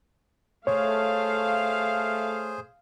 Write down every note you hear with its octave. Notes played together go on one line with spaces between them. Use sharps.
A3 G#4 C5 C#5 F5